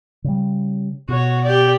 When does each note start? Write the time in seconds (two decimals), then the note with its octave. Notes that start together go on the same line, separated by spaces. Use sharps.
0.24 C#3 G3
1.08 B2 F#4 C#5
1.44 G4 D5